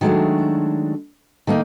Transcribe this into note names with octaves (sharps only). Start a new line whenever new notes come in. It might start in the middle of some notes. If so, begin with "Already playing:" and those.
D#3 F#3 G#3 A3 D4
D#3 A3 A#3 D#4